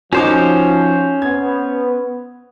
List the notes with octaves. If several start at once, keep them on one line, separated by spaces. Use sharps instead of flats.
F3 C#4 D#4 F#4 C5 D6
B3 G#6